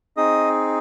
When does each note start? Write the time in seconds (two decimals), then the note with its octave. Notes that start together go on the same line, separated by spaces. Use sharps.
0.17 C4 D#4 G#4 D#5 D#6